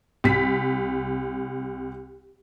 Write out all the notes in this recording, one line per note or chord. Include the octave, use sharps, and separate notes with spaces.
C2 B6